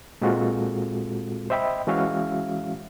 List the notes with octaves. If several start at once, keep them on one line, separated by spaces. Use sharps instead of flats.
A#2 G#3 C4 F4 F#4 A4
C5 D#5 E5 G5 B5
E3 G#3 C#4 F#4 E5 F5